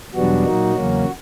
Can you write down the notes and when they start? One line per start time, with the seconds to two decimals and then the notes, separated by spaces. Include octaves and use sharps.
0.14 E2 B2 F#3 G3 B3 D4 F#4
0.45 A#2 F#3 A#3 D#4
0.76 E2 C#3 F#3 A#3 C#4